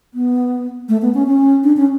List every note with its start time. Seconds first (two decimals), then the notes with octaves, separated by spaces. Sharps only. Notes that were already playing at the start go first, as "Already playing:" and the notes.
0.14 B3
0.89 A3
1.02 B3
1.14 C#4
1.27 C#4
1.64 D4
1.77 C#4